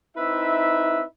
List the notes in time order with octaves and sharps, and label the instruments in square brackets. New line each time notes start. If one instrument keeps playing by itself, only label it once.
[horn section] C4 D#4 E4 B4 E5